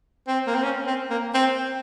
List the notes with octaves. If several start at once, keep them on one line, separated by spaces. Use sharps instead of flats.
C4
A#3
C4
C#4
C4
A#3
C4